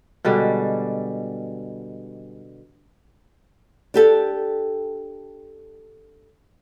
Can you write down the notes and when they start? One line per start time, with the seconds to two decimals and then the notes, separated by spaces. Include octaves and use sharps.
0.25 B2 D3 G3 G#3
3.94 D4 G4 A4